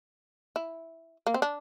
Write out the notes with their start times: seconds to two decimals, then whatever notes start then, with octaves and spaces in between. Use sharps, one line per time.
0.56 E4
1.27 A#3
1.34 C4
1.42 D4